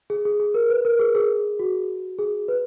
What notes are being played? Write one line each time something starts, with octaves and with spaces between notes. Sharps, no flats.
G#4
G#4
G#4
A#4
B4
A#4
G#4
G#4
F#4
G#4
B4